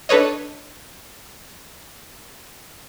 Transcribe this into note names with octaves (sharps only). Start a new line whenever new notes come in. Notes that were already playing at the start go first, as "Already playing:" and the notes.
D4 A4 B4 C#5 D#5